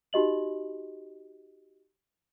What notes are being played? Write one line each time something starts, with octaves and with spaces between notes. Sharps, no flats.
D#4 F#4 G4 D#5 F#7